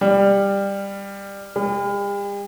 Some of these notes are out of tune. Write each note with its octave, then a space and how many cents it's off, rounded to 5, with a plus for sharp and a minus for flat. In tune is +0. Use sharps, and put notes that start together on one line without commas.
G3 +15
G3 +45